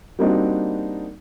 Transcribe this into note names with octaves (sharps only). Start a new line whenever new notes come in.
G3 A#3 C4 D4 D#4 F#4